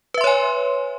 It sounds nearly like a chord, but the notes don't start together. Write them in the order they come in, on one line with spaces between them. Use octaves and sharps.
B4 E5 C6 C#5 G#5